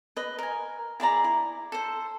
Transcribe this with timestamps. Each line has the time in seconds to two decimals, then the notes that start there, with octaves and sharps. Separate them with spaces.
0.17 B4 D#5
0.39 A#4 G#5
1.00 E4 G#4 D5 A#5
1.24 E4
1.72 A4 C5